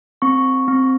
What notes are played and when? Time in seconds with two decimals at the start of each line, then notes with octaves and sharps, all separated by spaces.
0.22 C4 C#6
0.68 C4